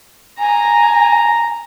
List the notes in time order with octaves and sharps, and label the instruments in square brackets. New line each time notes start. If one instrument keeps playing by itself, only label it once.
[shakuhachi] G#5 [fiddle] A#5